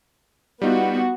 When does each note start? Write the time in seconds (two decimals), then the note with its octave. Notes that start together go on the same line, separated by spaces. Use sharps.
0.62 G3 B3 D#4 F4 F#4